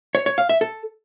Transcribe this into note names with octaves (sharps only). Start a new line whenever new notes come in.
C#5
C#5
F5
E5
A4